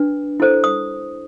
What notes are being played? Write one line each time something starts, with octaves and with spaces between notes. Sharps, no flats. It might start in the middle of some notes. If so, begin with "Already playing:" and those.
Already playing: D4 B4
E4 A4 C5
D#6